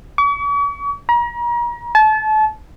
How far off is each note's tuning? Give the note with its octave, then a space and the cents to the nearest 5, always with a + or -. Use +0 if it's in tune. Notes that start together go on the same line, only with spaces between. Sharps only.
C#6 +45
A#5 +35
A5 -30